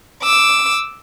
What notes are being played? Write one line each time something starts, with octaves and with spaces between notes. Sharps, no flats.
D6 E6